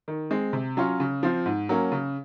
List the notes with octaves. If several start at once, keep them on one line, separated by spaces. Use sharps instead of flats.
D#3
G#3 C4
C3
F#3 C#4 F4
C#3
F3 C4 F4
G#2
F#3 A#3 C#4
C#3